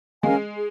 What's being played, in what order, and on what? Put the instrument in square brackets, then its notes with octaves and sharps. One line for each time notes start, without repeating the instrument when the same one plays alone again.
[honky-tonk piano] G#3 [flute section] C#4 A#4 F5 G#5
[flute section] G#4